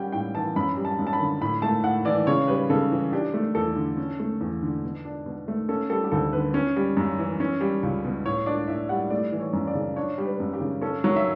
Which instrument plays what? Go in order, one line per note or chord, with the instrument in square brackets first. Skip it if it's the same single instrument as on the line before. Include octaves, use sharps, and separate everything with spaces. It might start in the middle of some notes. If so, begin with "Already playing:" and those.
Already playing: [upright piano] G3 C#4 F#5 G5
A2 G5
E3 A5
F#2 B5
G3
A5
F#2
A5
B5
D3
A2 B5
A3 A5
A2 F#5
E3 D5
C#3 C#5
G3 B4
C#3 A4
E3
D4 G4
A3
E2 A4
D3
C#4
A3
E2
D3
B2
D4
B2
A3
C#4 A4
G3 A4
G4
D2 A4
D3 B4
C#4
G3
F#2
E3
C#4
G3
C#2
B2
A2 C#5
D4 D5
A2 E5
G3 F#5
A3 D5
E3
C#5
F#2
D5
C#3
D4 C#5
G3
B4
F#2
G4
C#3
C#4 A4
F#3 C#5
E5